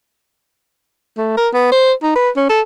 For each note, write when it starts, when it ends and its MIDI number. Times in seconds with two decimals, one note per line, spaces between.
1.18 1.37 57
1.37 1.49 70
1.54 1.71 59
1.72 1.92 72
2.03 2.14 63
2.16 2.30 71
2.37 2.46 61
2.49 2.61 69